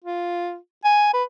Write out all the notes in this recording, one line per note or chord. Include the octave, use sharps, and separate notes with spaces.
F4
G#5
B4